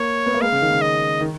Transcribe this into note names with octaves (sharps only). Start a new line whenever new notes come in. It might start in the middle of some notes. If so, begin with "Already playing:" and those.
Already playing: A#3 C#5
B3
A#3
G#3 F5
C#3
D#3
C#3
D#5
D#3